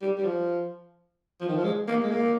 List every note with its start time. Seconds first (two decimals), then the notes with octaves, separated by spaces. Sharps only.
0.02 G3
0.18 G3
0.25 F3
1.41 F3
1.49 D#3
1.56 F3
1.64 G#3
1.88 A#3
2.04 G#3
2.11 A#3